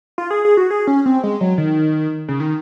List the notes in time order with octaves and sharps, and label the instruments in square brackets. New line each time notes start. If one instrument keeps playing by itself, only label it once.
[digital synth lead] F4
G#4
G#4
F#4
G#4
C#4
C4
G#3
F#3
D#3
C#3
D#3